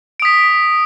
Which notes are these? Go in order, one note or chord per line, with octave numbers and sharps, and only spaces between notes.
D#6 B6 D7